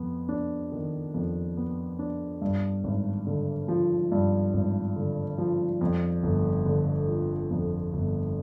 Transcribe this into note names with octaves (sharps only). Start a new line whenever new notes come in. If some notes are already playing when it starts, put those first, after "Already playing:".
Already playing: F2 B3
D4
D#3
F2
B3
D4
G2
G#1
D3
F3
G2
G#1
D3
F3
F2
G1
D3
F3
F2
G1